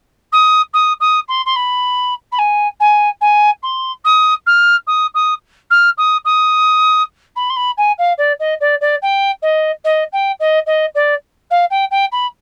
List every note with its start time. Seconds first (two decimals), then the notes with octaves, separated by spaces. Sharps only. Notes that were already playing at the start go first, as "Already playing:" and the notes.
0.32 D#6
0.73 D#6
1.00 D#6
1.28 C6
1.46 C6
1.56 B5
2.32 B5
2.38 G#5
2.80 G#5
3.21 G#5
3.63 C6
4.05 D#6
4.46 F6
4.87 D#6
5.14 D#6
5.70 F6
5.98 D#6
6.25 D#6
7.36 B5
7.50 C6
7.56 B5
7.77 G#5
7.98 F5
8.18 D5
8.40 D#5
8.60 D5
8.81 D5
9.02 G5
9.42 D#5
9.84 D#5
10.12 G5
10.40 D#5
10.66 D#5
10.95 D5
11.50 F5
11.70 G5
11.91 G5
12.12 B5